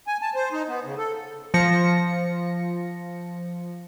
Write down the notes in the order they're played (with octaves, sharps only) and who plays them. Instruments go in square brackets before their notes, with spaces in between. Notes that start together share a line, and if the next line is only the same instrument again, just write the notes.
[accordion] G#5
A5
C5
D#4
B3
C#3
A4
[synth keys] F3 A#6 C#7